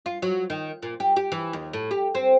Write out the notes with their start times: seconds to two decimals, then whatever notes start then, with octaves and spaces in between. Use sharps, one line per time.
0.06 F4
0.22 F#3
0.50 D#3
0.82 A#2
1.00 G4
1.16 G4
1.32 E3
1.53 D#2
1.73 A2
1.91 G4
2.15 C4